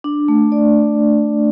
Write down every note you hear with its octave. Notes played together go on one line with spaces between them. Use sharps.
D4
A3
D5